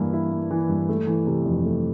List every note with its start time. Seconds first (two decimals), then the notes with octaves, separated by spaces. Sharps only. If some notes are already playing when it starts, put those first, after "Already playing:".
Already playing: G2 E3 A#3 E4
0.13 E4
0.32 A#3
0.51 E3
0.69 G2
0.89 A3
1.07 E3
1.27 C3
1.45 F2
1.65 A3